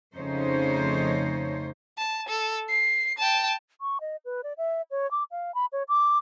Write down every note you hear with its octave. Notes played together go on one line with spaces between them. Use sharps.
F2 C#3 A3 D#4 C5 C#5
A5
A4
C7
G5 A5
C#6
D#5
B4
D5
E5
C#5
D6
F5
B5
C#5
D6